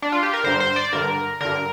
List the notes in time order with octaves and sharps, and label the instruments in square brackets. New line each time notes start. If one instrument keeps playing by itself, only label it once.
[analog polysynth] D4
F4
G4
A#4
G2 D3 C5
C5
D5
G2 D3 A#4
G2 D3 A#4